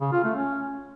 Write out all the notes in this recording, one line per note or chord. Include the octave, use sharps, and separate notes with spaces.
C#3
F4
A3
C#4